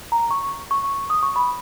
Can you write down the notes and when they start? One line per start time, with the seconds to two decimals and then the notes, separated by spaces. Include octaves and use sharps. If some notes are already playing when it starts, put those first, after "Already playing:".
0.12 A#5
0.31 C#6
0.71 C#6
1.10 D#6
1.23 C#6
1.36 B5